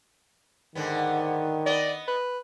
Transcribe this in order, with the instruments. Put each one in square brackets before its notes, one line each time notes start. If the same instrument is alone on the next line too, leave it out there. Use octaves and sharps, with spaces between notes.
[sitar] G#2 D3 B3 [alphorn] D#3
[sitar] B3 D#5 [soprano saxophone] D5
[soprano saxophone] B4